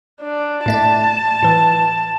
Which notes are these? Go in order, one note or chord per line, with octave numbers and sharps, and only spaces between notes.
D4
A2 A3 D5 A5
A2 E3